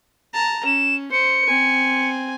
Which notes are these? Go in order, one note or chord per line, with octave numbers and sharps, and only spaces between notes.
A5 A#5
C#4 E7
C5 C#7
C4 G#5